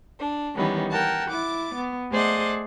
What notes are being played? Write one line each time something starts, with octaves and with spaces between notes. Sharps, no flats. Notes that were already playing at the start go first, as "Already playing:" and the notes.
D4
D#3 E3 G3 B3 C#4
A#4 F#5 G5 A5
E4 D6 A6
B3
A3 G#4 C5 D5 D#5 F#5